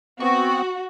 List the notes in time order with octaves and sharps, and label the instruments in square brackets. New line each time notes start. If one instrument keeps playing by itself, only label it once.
[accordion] B3 C4 [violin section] F#4 [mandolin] C#6